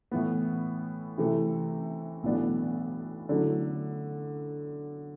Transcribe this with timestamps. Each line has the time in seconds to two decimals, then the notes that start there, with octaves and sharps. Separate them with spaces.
0.12 A2 E3 B3
1.18 C3 E3 A3
2.23 B1 A2 E3 B3 D4
3.29 D3 F#3 A3 E4 A4